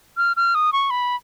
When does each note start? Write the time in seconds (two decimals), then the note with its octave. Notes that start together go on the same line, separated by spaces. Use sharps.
0.17 F6
0.37 F6
0.55 D#6
0.73 C#6
0.90 B5